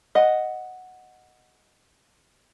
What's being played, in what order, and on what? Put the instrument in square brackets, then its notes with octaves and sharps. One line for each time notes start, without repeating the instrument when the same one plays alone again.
[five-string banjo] D#5 F#5